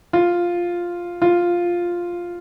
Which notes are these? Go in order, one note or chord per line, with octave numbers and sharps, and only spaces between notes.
F4
F4